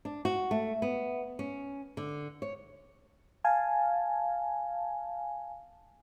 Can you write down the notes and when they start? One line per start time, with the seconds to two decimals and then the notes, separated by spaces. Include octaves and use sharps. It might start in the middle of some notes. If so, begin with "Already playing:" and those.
0.05 D4
0.25 F#4
0.51 A3
0.82 B3
1.39 C#4
1.97 D3
2.42 C#5
3.44 F5 G#5 A5